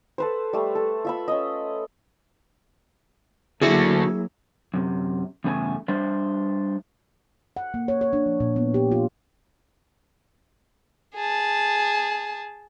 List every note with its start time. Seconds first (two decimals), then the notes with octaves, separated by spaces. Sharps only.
0.18 A4 B4 C5
0.53 G3 A3
0.75 A4
1.05 F4 E5 B5
1.28 C#4 D#5
3.62 D3 F#3 A#3 E4 F#4 G#4 A4
4.74 F#2 C3
5.44 E2 G2 C#3 A3 D#4 G#5
5.88 G3 D4 C5 D5 E5
7.57 F#5
7.74 A#3
7.88 C#5
8.01 C#5
8.13 D4
8.26 F3
8.40 A#2
8.56 B3
8.74 G4
8.92 F4
11.15 G#4 A5